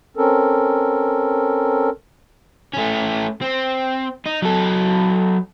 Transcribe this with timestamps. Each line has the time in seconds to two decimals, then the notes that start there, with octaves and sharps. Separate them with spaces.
0.17 C4 C#4 A4 A#4
2.74 A3 C#4
3.42 C4
4.26 D#4
4.42 F#3 A4